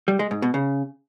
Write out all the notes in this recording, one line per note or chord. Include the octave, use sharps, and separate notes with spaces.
G3
G#3
G#2
B2
C#3